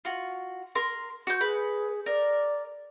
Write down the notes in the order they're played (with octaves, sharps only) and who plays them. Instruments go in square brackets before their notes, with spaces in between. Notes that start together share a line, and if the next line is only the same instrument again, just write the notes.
[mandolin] F4 F#4
A#4 C6
F#4 G6
[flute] G#4 [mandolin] B4
[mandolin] A#4 [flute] D5